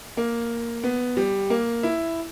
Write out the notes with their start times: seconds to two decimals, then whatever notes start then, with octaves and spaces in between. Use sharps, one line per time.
0.17 A#3
0.84 B3
1.17 G3
1.50 A#3
1.83 E4